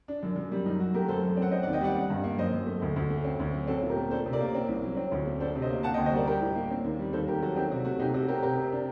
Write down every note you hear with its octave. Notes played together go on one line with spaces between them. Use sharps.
D4
F#2
F#2
G3
F#2 D#4
F#2 F#4
A3 G4 A#4
F#2 A4 C5
F#2
C4
F#5
C4 C5 D#5
D5 F#5
D#2
D#5 G5
G3 D5 F#5
D4
G2
A#3
F#2 C5 D#5
F#2
A3
D2
D2
A3
C4
D2
F#3
C4 F#4 A4
A#2
G4 A#4
A3
D4 A4 C5
C3
A#4 D5
A#3
C4
C2
F#3
C4
D2
A3
D4 A4 C5
C3
C5 D#5
A#3
A#3 F#5 A5
D#5 G5
D2
C5 D#5
G3 A#4 D5
D4 G4 A#4
A2
A#3
C4
D#2
G3
D#2 A4 C5
D#2 G4 A#4
F#3 F#4 A4
C4 D#4 G4
C3 F#4
A3 F#4
C3 D#4 G4
C3 F#4 A4
C4 G4 A#4
C3 G4 A#4
C3
D4